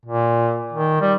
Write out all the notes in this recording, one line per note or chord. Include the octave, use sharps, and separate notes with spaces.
A#2
D#3
G3